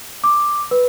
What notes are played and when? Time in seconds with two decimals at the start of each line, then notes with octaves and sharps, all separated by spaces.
0.24 D6
0.71 B4